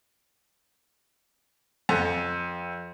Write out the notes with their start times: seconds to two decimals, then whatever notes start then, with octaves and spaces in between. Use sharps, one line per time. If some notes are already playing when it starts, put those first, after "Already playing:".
1.89 F2